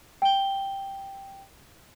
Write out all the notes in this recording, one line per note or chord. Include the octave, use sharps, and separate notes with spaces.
G5 G7